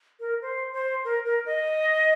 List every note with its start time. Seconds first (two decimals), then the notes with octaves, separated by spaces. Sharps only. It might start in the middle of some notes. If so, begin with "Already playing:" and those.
0.20 A#4
0.42 C5
0.73 C5
1.05 A#4
1.25 A#4
1.46 D#5